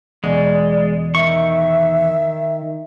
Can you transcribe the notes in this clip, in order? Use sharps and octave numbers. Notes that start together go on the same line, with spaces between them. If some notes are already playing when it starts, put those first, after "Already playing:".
E2 B2 G#3 D5
D#3 E5 C#6